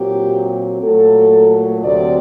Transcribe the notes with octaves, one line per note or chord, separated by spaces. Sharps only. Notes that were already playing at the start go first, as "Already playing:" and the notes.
Already playing: A#2 F#3 C4 G4
A#2 F#3 A3 A4
D2 C3 F#3 A3 C4 D5